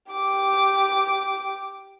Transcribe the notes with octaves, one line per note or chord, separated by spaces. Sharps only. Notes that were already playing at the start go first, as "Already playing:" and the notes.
G4 D6